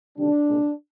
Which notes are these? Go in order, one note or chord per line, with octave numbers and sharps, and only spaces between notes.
D2 C3 D#3 G3 D4
C2 A#2 G#3